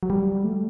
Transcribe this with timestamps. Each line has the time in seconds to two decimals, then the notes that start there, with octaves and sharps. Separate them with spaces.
0.03 F#3
0.10 G3
0.44 A3